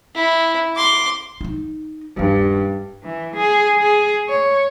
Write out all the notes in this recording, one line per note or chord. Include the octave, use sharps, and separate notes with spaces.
E4
C6 D6
D#4 E4
D#1 G2 C#4
E3
G#4
G#4
C#5